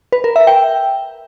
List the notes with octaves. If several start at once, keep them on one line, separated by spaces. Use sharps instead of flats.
B4
A#4
E5
G5